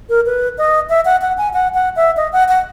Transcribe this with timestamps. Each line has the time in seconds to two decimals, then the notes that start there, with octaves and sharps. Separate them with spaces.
0.10 A#4
0.26 B4
0.58 D#5
0.89 E5
1.05 F#5
1.22 F#5
1.38 G#5
1.53 F#5
1.74 F#5
1.96 E5
2.17 D#5
2.33 F#5
2.49 F#5